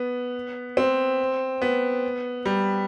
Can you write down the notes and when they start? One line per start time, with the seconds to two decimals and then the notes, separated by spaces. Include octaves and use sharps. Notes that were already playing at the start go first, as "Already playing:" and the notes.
Already playing: B3
0.77 C4
1.62 B3
2.45 G3